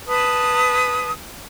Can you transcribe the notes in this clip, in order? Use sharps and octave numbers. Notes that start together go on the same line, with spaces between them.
B4 A5 D#6